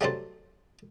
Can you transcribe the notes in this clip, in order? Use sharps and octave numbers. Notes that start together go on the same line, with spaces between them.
F#3 G3 A3 D4 A4 C5